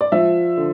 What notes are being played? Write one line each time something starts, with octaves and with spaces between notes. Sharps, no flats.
D5
F3 E5
D3